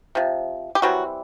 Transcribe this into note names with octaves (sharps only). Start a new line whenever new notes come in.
C3 F3
G4
E3 F#3 G3 C4 F#4